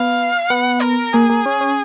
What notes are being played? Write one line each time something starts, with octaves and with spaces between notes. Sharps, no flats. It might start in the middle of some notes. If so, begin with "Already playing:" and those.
Already playing: B3 F5
B3 F#5
A#4
A#3 G#4
A#3
C#4
C#4